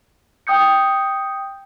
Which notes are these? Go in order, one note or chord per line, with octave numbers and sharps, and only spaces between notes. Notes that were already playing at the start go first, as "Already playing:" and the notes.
G5 D#6 G6 C#7